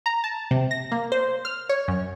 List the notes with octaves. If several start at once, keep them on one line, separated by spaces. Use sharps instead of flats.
A#5
A5
C3
A#6
A#3
C5
F6
C#5
F#2